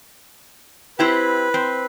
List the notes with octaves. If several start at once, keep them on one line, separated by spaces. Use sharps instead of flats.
C4 E4 G4 B4
C4